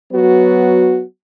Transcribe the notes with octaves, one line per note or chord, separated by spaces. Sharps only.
F#3 B3 F#4